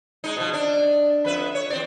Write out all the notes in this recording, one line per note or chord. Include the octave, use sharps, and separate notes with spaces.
G#3 D#4
B2 F3
D4
F2 B4 E5
C#5
E2 C4 D5